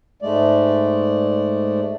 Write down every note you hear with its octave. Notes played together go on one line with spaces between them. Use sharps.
G#2 G#3 A3 D5